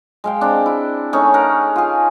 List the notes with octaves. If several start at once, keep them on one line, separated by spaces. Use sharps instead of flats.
G#3 F5 G5
C4 D4
E4
A3 C#4 D#4 G#4
A#4 F#5
F4 G#4